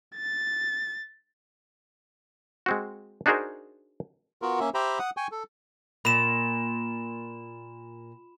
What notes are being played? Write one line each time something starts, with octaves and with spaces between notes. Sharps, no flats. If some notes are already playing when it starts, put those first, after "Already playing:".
A6
G#3 C4 F#4
D4 D#4 F#4 G#4 A#4 C5
B3 F4 F#4 A#4
A#3 C#4 E5
G4 C5 E5 G5 A#5 B5
F#5 D#6
G5 G#5 C#6
A4
A#2 B5 E7